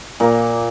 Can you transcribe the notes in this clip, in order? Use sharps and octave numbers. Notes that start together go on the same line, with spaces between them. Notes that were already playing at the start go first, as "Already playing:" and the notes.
A#2 A#3 A#4